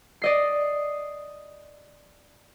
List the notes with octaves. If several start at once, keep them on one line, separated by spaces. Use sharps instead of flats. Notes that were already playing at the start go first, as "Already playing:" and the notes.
D5 D#5 C7